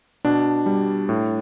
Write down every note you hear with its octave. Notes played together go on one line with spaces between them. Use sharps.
B2 D4
G3
A2